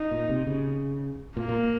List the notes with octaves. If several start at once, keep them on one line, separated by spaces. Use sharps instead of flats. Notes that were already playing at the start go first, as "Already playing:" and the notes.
Already playing: D#4
A#2
C3
C#3
A#2 A#3
A#2